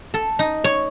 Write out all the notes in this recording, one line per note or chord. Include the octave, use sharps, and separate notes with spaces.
A4
D#4
C#5